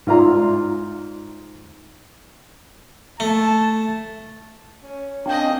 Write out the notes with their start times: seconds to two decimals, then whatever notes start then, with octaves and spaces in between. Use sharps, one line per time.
0.07 G#2 F4 D5 A#5 C6
3.20 A3 A5
4.83 C#4
5.26 A#3 C4 D4 D#5 F5 G5 G#5 G6